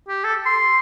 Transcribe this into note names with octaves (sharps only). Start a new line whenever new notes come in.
G4
A4
C6